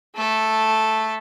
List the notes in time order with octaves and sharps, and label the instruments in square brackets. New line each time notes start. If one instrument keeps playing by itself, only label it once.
[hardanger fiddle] A3 A4